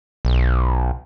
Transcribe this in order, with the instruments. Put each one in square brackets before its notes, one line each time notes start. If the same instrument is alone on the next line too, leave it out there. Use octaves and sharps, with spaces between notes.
[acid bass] B1